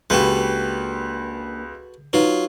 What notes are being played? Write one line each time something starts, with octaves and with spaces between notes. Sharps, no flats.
C#2 A#3 D4 F#4 G4 A4 B4
F#3 D#4 F4 B4